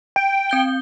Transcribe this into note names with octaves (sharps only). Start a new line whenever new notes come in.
G5
C4 G6 G7